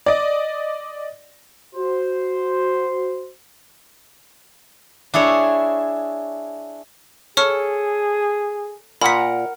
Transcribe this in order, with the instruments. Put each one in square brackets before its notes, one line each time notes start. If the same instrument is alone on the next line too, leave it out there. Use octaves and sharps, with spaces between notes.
[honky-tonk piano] D5 D#5
[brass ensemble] F#4 C5
[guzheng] D4 E4 G#4 C#5
[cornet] G#4 [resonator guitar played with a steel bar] A4 [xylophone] C#5 C#6 F6
[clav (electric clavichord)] A#2 [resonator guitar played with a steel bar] A#4 F#5 [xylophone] B5 B6